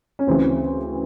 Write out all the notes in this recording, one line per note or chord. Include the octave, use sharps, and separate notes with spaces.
C#4
D2 C#3 E3 C4